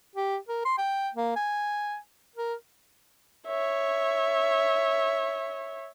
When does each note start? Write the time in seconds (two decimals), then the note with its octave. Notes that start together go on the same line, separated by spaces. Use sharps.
0.15 G4
0.48 A#4
0.65 C6
0.78 G5
1.14 A#3
1.36 G#5
2.35 A#4
3.47 C#5 E5